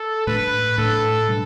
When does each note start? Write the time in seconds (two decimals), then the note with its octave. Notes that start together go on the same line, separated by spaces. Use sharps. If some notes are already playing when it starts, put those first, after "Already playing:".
Already playing: A4
0.27 A2 A3 D4 B4
0.77 A2 A3 D4 A4
1.28 B2 G3 D4